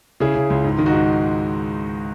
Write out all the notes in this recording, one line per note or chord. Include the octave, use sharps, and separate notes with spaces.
C#3 E4 G#4
C#3
C#2
G#2
D#3
D#4 F#4
G#2